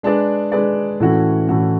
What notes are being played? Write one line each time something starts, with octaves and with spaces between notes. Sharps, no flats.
G#3 D4 G#4 B4 D5
G#3 D4 G#4 B4 D5
A2 E3 A3 C#4 F#4
A2 E3 A3 C#4 F#4